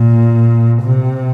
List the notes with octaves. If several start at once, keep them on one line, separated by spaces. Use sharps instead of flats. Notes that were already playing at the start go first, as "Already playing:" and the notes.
Already playing: A#2
C3